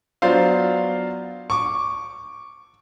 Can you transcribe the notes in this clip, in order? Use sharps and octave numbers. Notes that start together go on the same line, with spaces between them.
F#3 B3 D4 F4 C5 F5
C#6 D6